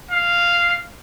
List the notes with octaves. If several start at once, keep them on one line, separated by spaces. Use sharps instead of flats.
F5